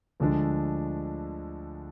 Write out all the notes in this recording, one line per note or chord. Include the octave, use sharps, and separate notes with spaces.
D2 D3 F3 G#3 D4